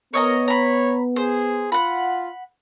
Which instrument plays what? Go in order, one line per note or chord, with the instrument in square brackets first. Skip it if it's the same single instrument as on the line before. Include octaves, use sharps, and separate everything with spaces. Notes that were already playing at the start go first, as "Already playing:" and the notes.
[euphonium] B3 [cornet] A#4 [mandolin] C#5 D#5 A#5
[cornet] C#5 [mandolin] A#5 B5
[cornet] G#4 [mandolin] C5
[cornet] F4 [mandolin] F#5 B5